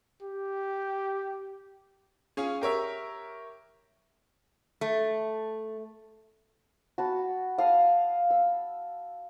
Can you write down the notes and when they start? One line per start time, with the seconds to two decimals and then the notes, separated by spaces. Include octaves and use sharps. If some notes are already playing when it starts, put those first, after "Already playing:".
0.22 G4
2.37 C#4 F4 G#4
2.62 G4 A#4 C#5 E5
4.81 A3
6.98 F#4 A5 B5
7.58 F5 A5 D#6
8.30 E6